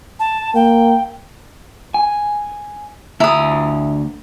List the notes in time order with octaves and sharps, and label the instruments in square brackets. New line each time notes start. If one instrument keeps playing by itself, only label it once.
[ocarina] A5
[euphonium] A#3 [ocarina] G5
[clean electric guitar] G#5
[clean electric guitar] D2 A#5 [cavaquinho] E4 D#6